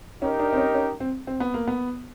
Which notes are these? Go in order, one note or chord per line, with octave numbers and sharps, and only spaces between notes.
C#4 D#4 G4 A#4 D#5
D4
C4
C#4
C#4
C4
C4
B3
A#3
B3